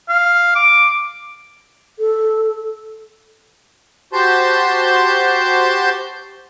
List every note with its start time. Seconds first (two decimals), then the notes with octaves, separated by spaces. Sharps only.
0.09 F5
0.55 D6
1.99 A4
4.13 F#4 G4 C5 A5 C6 G6